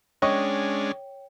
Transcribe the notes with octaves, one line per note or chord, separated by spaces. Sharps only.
G#3 C#4 D4 C#5 D#5 G5 C#6